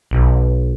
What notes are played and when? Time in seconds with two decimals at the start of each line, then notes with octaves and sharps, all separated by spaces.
0.11 B1